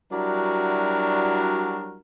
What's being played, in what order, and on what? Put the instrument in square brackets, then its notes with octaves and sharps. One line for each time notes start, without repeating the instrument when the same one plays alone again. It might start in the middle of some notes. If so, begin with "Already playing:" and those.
[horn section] F#3 G3 D4 E4 F#4 A#4